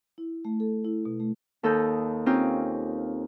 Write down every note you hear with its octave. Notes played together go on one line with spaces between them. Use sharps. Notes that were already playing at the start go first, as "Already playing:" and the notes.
E4
A3
A4
E4
B2
A3
D#2 A4 D#5 G6
C4 C#4 D#4 F4 G4